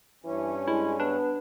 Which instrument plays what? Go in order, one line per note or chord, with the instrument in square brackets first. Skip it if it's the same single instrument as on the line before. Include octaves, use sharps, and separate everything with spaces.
[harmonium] G2 C#4 [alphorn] E3
[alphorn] G#3 [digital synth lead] E4
[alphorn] B3 [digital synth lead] D4